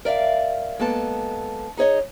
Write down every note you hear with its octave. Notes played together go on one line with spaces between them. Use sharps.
A#4 D5 E5 F5
G#3 A#3 B3 A4 A5
D#4 G#4 C#5 D#5